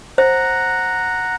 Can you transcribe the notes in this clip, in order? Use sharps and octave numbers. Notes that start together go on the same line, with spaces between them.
C5 F#5 A#5